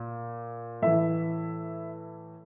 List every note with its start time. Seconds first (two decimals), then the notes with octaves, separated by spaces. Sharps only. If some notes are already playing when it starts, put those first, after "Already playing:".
Already playing: A#2
0.82 A2 E3 E5